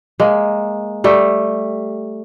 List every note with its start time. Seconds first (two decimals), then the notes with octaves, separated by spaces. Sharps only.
0.20 G#3 A#3
1.04 G3 A3